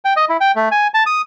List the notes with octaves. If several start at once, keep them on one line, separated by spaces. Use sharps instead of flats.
G5
D#5
E4
G5
A3
G#5
A5
D#6